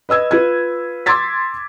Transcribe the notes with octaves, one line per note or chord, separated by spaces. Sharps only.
B4 D#5 E6 G#6
F4 B4 G#6
C6 D6 E6 G#6 A6 B6